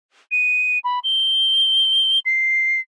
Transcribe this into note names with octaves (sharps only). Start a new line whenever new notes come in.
D#7
B5
G7
C7